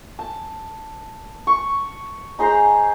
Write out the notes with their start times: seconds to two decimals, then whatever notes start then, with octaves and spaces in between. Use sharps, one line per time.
0.19 A5
1.47 C#6
2.39 D#4 G#4 C5 A#5